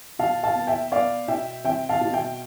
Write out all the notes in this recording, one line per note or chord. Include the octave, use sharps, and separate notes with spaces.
B2 F5 A5
F5 A5
B3
E5 G5
B3 D5 F5
B2 E5 G5
C4 E5 G5
F5 A5
B2
E5 G5